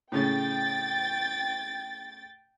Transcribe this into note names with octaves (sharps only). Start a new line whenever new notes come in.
A2 C#3 C#4 G5 A6